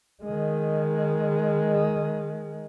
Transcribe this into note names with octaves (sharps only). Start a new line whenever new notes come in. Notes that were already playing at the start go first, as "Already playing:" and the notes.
D#3 G#3